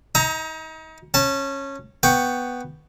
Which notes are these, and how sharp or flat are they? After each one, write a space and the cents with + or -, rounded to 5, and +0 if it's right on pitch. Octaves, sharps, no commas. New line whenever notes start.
D#4 +35 A#5 +0 D#6 +45
C#4 -15 A5 +0
B3 +0 G5 +0 C#6 +0